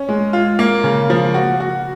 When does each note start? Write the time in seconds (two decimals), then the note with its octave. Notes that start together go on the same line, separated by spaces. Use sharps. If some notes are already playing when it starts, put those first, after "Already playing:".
Already playing: C#4
0.09 G#3
0.33 F4
0.59 A#3
0.84 C#3
1.10 F3
1.34 F#4
1.60 F#4